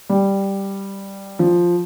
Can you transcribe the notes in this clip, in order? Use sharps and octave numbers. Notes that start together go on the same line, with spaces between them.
G3
F3